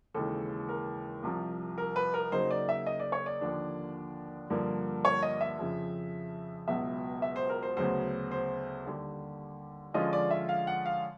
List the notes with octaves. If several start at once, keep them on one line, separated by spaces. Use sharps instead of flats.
D#2 C#3 E3 G#3 A4
A#4
C2 C3 F3
A#4
B4
A#4
C#3 F#3 A#3 D#4 C5
D5
E5
D#5
D5
C#5
D5
D#2 D3 F3 A#3 D4
G2 D3 F3 A#3
C#5
D#5
E5
F2 C#3 F3
C#2 B2 F#3 B3 E5
E5
C5
A#4
C5
D2 C#3 F#3 B3 C5
C5
D#2 D3 G3
D3 F3 G#3 C#4 F4 D#5
D5
E5
F5
F#5
F5